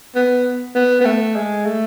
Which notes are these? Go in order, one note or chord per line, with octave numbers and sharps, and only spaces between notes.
B3
B3
B3
A3
G#3
A3